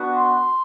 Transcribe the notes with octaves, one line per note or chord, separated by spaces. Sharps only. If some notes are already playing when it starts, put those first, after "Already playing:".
Already playing: B3 D4 F#4
C6